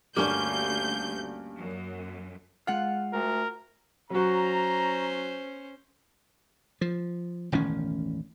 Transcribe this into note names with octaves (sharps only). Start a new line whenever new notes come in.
D2 G2 G3 A#3 C#4 G6
F#2
G#3 F4 F5 F#5
D2 A#4
F#3 C#4 F#4 C5 A#5
F3
E1 A1 D#3 C#4